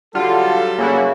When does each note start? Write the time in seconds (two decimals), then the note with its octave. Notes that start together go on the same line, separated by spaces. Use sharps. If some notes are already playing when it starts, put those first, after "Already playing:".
0.15 D3 F#3 G3 F4 A4
0.78 C#3 A#3 E4 F#4